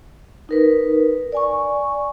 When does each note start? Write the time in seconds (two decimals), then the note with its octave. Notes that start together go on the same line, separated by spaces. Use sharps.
0.49 D#4 A#4 B4
1.32 D5 G#5 C#6